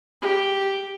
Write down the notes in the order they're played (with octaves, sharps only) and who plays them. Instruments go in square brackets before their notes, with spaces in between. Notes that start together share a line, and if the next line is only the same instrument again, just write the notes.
[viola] G4